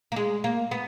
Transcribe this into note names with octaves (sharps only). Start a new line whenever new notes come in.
A#3
G#3
A#3
B3